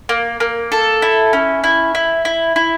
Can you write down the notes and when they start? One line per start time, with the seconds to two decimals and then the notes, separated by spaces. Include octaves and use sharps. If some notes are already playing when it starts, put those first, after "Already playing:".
0.09 A#3
0.40 A#3
0.72 A4
1.02 E4
1.33 C#4
1.64 E4
1.95 E4
2.25 E4
2.56 E4